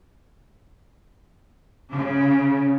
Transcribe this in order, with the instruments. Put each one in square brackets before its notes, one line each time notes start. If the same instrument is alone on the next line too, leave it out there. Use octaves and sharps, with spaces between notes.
[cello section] C#3